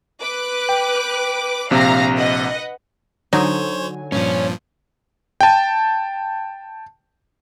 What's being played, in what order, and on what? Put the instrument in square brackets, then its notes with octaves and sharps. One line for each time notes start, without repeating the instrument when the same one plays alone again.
[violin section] B4 D6 F#6
[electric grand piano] G5
[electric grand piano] A#1 C3 [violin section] F5 A#5
[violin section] B4 D#5 F#5
[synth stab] D3 F#3 G#5 [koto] D#4 [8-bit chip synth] C5 C#5
[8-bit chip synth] G2 A#2 F3 [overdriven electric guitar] C#4
[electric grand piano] G5 A5